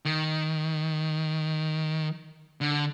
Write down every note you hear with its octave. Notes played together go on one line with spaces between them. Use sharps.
D#3
D3